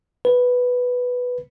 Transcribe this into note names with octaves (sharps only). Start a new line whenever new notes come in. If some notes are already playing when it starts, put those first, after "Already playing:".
B4